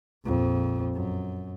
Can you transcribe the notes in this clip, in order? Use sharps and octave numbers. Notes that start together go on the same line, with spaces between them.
A#1 F2
F#2